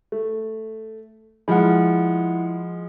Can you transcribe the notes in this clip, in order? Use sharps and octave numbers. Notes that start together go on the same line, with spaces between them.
A3
F3 G#3 E4 F#5